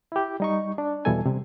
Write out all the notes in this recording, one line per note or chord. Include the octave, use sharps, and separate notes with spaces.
E4 G4
G3 D#4 C#6
D4
E2 B2 E3 G3 A4 G#5
C3 G3